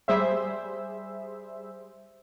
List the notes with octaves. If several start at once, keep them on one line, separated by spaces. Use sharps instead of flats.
G3 G#4 C5 E5